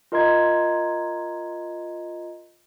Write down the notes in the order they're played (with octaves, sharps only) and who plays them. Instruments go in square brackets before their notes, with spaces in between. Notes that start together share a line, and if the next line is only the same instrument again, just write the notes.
[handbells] F4 A#4 D#5 A#5 C6 G#6